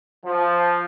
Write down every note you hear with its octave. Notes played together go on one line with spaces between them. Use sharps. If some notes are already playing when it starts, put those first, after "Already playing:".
F3